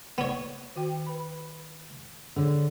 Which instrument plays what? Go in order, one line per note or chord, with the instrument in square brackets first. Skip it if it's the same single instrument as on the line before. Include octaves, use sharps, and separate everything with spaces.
[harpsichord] B3 C#5
[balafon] D#3 F#4 G5
B4 B5
[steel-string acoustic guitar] D3 [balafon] G#4 C#5